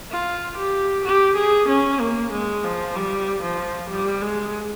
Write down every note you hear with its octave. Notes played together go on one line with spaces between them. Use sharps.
F4
G4
G4
G#4
C#4
A#3
G#3
F3
G3
F3
G3
G#3